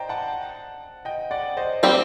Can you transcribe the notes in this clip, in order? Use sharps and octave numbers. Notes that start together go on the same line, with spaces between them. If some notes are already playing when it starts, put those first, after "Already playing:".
Already playing: C5 D5 D#5 G5 A#5
F#5 A5
D#5 G5
D5 F#5
C5 D#5
G3 C4 G4